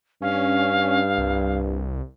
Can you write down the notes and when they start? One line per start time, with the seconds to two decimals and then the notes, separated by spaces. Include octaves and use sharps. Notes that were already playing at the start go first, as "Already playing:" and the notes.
0.22 G2 C#4 F5
1.18 C2